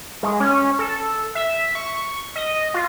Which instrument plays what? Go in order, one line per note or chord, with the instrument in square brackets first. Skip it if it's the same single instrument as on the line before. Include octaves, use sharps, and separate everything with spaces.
[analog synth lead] G#3
C#4
A4
E5
C#6
D#5
F4